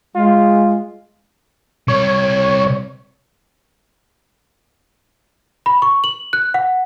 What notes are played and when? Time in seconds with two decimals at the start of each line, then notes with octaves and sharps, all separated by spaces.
0.15 G#3 F4
1.88 C3 G3 C#5
5.66 B5
5.82 C#6
6.04 F#7
6.33 F#6
6.54 F#5